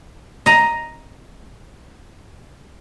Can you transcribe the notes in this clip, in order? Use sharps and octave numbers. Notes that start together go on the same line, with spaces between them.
D#5 A#5